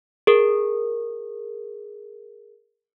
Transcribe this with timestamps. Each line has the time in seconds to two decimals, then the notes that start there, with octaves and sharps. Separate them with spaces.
0.27 G#4 A#4